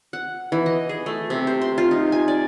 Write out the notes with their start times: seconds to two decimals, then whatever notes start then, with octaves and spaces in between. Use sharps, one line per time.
0.13 F#5
0.52 E3
0.66 D#5
0.89 G#4
1.06 A3
1.30 C3
1.47 C5
1.62 C6
1.78 F4
1.91 D#4
2.12 G#5
2.28 D5